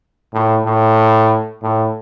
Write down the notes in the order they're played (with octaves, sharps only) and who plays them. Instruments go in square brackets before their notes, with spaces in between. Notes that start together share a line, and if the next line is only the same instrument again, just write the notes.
[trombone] A2
A2
A2